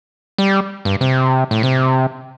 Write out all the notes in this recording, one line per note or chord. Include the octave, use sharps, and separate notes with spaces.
G3
G2
C3
A2
C3